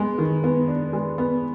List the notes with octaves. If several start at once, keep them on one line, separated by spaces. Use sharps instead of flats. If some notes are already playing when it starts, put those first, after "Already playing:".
Already playing: G#3 B3
D#3
B3
D4
G#3
B3